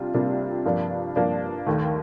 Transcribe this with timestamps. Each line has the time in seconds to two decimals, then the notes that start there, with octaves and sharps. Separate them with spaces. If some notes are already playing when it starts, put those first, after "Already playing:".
Already playing: C3 G3 D4 F4
0.14 C3 G3 A#3 D4 F4
0.65 G2 F3 A#3 D4
1.16 G2 F3 A#3 D4
1.66 D#2 D#3 A3